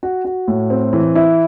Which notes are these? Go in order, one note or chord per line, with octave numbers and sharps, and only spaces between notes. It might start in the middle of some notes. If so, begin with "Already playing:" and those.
F#4
F#4
A2
C4
E3
E4